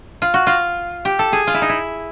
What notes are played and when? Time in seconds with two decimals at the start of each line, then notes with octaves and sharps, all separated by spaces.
0.22 F4
0.34 F#4
0.47 F4
1.05 G4
1.19 A4
1.33 G#4
1.47 F4
1.54 E4
1.62 D#4
1.69 E4